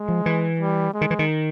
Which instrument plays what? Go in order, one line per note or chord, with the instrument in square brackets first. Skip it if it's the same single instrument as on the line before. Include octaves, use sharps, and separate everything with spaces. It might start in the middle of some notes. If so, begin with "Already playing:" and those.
Already playing: [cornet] G#3
[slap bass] F3
E3
[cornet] G3
G#3
[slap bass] D#3
E3
D#3